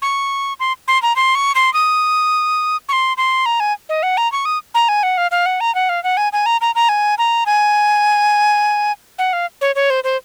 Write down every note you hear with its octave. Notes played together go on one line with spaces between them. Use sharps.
C#6
C6
C6
A#5
C6
C#6
C6
D#6
C#6
C6
C6
A#5
G#5
D#5
F#5
A#5
C#6
D#6
A#5
G#5
F#5
F5
F5
F#5
A#5
F#5
F5
F#5
G#5
G#5
A#5
A#5
A#5
G#5
A#5
G#5
F#5
F5
C#5
C#5
C5
C5